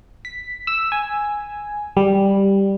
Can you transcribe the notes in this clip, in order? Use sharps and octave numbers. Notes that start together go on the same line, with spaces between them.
B6
E6
G#5
G3